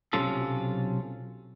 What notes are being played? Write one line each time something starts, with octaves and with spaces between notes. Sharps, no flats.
B1 C3 F#3 C#4 F4 A4